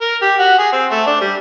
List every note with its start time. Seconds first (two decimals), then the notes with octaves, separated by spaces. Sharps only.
0.01 A#4
0.22 G4
0.39 F#4
0.59 G#4
0.72 C4
0.91 A3
1.07 D4
1.21 G3